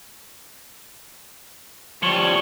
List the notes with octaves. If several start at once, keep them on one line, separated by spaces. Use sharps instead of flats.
F3 G3 C#5 C#7 F#7 G7